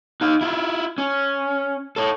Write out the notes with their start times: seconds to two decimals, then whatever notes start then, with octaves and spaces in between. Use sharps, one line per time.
0.21 D#4 F5
0.41 E4 F4
0.98 C#4
1.96 A4 C#5